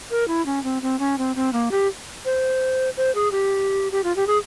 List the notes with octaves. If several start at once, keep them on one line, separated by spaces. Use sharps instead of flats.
A#4
E4
C#4
C4
C4
C#4
C4
C4
A#3
G4
C5
C5
G#4
G4
G4
F4
G4
G#4